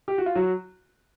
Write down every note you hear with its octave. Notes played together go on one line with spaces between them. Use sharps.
G4
F#4
F4
F#3 F#4